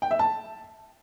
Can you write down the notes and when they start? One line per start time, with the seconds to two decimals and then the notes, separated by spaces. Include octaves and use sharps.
0.02 G5
0.11 E5
0.19 A5